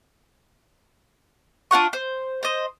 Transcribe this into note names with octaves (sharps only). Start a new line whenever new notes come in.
D4 F4 F#5 C#6
C5
C5 D#5